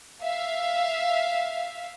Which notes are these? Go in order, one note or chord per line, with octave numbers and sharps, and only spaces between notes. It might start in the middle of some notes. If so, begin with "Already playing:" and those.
E5 F5